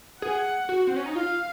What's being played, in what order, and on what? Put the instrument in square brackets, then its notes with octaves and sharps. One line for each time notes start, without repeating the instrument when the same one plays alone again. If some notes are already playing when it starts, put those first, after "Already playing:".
[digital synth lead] G#4 [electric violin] F#5
[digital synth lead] F#4
C4
C#4
D#4
[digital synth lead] F4 [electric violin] F5